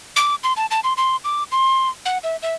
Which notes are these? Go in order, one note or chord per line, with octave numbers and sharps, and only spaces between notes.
D6
C6
A5
A5
C6
C6
D6
C6
F#5
E5
E5